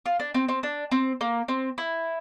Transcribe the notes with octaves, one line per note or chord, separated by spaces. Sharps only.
F4
D4
C4
C4
D4
C4
A#3
C4
E4